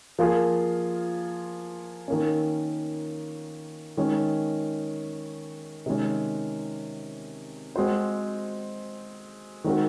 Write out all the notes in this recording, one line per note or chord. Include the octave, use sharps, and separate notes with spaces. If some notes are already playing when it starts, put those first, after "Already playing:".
F3 A#3 F4 G#4
D#3 A#3 C#4
D#3 G#3 C#4
C3 D#3 G#3 C#4
G#3 C4 F#4 C5
D#3 G#3 C4 F#4 A#4